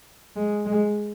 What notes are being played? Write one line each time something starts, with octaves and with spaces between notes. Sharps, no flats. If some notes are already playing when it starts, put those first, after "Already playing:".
G#3
G#3